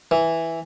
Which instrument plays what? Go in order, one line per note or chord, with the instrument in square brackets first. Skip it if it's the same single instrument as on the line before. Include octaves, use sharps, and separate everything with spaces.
[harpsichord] E3